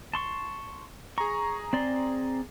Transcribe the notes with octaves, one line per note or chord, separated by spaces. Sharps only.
A5 C6 C#6
G#4 A#5 C#6
C4 D5 C6